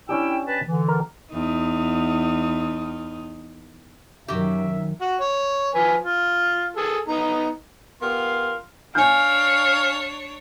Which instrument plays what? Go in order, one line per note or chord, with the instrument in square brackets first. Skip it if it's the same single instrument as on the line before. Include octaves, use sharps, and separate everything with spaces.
[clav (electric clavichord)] C#4 D4 G4 [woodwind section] E4 G5 E6
[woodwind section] B4 A5
D3 E3
[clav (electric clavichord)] A#4 A5
[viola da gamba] E2 D#4
[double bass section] F#2 D#3 [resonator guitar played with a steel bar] F#4 G4 [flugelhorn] E5
[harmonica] F#4
C#5
F3 B4 G#5
F4
G#4 A4
B3 D#4 A#5
[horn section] B3 F4 G4 A#4 F5 C6
[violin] D4 C#5 [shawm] F5 [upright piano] G#5 G6